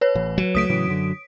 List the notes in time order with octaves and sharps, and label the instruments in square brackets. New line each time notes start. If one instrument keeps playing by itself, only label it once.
[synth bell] B4 C#5
[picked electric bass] A1 E3
[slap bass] F#3
[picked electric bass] C#2 A3 [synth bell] D#6 B6 D7
[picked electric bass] A2 C#3 E3
F#2 D3